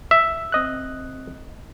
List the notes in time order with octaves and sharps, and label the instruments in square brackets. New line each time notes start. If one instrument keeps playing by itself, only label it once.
[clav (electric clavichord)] E5
[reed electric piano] C4 D#5 F#6